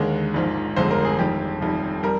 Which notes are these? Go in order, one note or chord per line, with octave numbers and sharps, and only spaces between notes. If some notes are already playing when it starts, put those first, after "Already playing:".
Already playing: D#2 D3 G#3 A#4
A#1 G#2 F3
G1 F2 D3 G#3 C5
A#4
G#4
F2 D#3 G3 G4
F1 F2 D#3 G3
G3 A#4